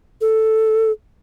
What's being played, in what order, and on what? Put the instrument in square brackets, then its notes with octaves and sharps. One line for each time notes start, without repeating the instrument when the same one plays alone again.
[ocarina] A4